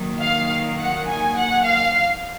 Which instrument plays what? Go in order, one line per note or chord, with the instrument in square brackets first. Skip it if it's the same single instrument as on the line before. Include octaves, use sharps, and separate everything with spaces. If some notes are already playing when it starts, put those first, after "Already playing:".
Already playing: [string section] D#3 F#3 A#3
[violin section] F5
F#5
G#5
F#5
F5